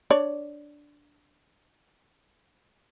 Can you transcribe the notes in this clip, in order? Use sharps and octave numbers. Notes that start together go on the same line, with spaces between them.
D4 C#5 D5